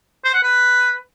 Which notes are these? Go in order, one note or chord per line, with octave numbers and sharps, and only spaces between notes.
C5
F#5
B4